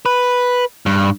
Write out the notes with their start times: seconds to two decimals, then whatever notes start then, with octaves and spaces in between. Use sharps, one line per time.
0.06 B4
0.86 G2